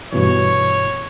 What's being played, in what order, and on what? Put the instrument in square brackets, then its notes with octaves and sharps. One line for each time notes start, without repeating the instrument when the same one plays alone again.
[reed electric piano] G2 B2 E3 [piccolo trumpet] C#5